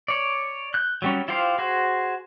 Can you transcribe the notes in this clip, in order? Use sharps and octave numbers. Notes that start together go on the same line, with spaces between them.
C#5 D5
F#6 G6
F#3 G3 C#4
E4 F4 G4 C5 F5
F#4 G#4 C5